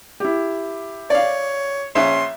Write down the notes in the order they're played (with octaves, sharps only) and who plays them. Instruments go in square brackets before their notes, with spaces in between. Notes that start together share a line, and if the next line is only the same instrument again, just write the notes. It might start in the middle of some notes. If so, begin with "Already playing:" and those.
[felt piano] E4 G4
[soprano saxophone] C#5 [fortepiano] D5 F5
[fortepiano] A#1 C#4 [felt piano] E5 [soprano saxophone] C6